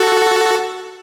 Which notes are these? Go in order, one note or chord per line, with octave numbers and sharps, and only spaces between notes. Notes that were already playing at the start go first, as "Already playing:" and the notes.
Already playing: F#4 A4